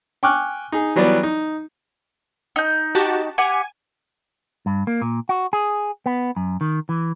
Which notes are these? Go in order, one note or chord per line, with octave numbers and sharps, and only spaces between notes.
G5 G#5 C#6 D6 F6 F#6
D#4 G#4
E3 F#3 G3 B3 D5
D#4
D#4 G6
F#4 G4 A5
G4 F#5 G#5
G2
A#3
A#2
F#4
G#4
B3
F#2
D#3
E3